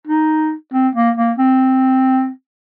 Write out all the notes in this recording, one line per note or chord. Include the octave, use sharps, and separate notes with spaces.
D#4
C4
A#3
A#3
C4